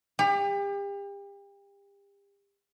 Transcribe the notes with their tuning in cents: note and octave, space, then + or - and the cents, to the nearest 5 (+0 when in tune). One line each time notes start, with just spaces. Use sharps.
G4 +35